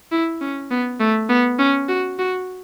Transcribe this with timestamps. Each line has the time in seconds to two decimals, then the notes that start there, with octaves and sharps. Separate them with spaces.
0.12 E4
0.41 C#4
0.71 B3
1.00 A3
1.29 B3
1.59 C#4
1.89 F#4
2.19 F#4